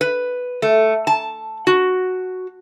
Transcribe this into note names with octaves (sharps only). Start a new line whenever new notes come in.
B4
A3
A5
F#4